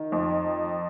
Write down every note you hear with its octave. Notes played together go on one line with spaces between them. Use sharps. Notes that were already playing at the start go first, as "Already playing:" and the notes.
Already playing: D#3
F2